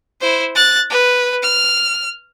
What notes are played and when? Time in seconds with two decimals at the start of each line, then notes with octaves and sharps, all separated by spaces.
0.21 E4 C5
0.56 F#6 A6
0.90 B4
1.43 F6